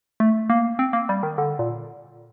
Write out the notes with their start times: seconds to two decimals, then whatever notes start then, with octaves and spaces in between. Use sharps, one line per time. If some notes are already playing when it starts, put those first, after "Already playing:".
0.20 A3
0.50 A#3
0.79 C4
0.93 A#3
1.09 G3
1.23 D#3
1.38 D3
1.59 A#2